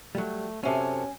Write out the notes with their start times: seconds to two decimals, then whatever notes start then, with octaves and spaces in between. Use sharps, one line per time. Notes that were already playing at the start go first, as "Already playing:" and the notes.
0.15 F#3 G3 A3
0.63 F#2 C3 C#4 A4 G#5